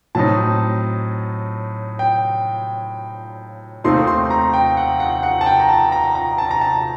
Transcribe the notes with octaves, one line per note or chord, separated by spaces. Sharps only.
A2 F#3 C4 D#4 A5
G5
D#2 D#3 A3 C4 D#4 C6
C6
A#5
G5
F#5
F#5
F#5
A5
G5
A#5
A5
A#5
A#5
A5
A#5
A5